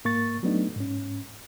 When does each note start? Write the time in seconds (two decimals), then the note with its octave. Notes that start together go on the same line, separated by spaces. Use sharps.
0.05 G#2 A#3 C#6 A6
0.43 F#3 A3 B3 D4 D#4
0.77 G#2 C#4